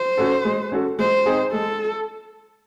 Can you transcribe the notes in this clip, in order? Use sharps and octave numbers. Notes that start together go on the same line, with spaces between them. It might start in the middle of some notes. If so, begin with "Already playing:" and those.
Already playing: C5
C#4 F#4 A4
G#3
C#4 F#4 A4
G#3 C5
C4 D#4 G#4
G#3 A4